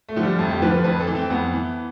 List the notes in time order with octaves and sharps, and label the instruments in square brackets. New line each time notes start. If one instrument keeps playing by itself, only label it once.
[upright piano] A3
D3 F3
G3
F2 A3
G4
D3 F3 B4
B4
F2 B4
A4
E3
C4
F2 B3
E3